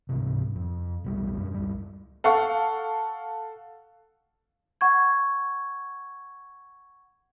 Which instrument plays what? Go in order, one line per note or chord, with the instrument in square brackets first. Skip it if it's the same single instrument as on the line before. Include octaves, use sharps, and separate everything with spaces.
[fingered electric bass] C#2 G#2 C3
F2
E1 B1 G3
F#2 D4
C#2 G3
[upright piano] A4 F5 F#5 C#6
[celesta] F#5 C#6 G#6